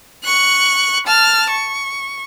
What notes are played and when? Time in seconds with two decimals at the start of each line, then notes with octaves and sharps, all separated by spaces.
0.24 C#6 F#6
1.07 A5 F6
1.50 C#6